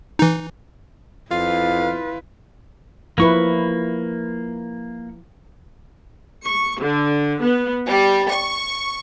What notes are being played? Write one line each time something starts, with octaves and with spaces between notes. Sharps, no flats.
E3 D#4
F2 E4 F4 B4 F5
F3 A#3 E4 B4 C#6
C#6
D3
B3
G3
C#6